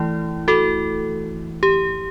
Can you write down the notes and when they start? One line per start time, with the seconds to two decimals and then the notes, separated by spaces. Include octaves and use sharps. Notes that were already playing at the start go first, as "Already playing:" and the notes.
Already playing: E3 A3 E4
0.48 F#4 A4
1.63 G4